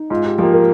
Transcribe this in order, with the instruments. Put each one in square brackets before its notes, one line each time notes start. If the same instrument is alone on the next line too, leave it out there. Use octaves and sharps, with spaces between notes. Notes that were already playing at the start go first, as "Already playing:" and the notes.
Already playing: [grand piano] D#4
[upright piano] G#2 [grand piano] F4
[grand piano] G4
[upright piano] F3 A#3 [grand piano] G4
[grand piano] A#4